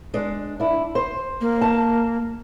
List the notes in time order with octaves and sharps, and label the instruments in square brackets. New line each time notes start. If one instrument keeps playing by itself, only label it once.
[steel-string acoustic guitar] G#3 D4
D4 E4
C5
[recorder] A#3
[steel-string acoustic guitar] A5